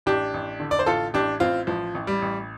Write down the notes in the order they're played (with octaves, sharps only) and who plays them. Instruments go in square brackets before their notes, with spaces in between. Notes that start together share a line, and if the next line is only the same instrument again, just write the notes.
[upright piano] A1 D4 G4
A1
D3
D5
C5
A1 F4 A4
A1 D4 G4
A1 C4 F4
A1 F3
A1
G3
A1